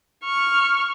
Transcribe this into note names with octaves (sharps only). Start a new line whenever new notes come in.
C#6 F6